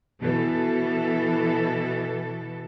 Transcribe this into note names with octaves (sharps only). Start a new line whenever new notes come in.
B2 E3 A4